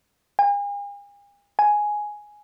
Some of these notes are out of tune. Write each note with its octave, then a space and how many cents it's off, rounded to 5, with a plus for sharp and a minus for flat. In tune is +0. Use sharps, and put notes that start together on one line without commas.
G#5 -45
G#5 +5